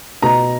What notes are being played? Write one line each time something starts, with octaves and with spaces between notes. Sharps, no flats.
B2 A#5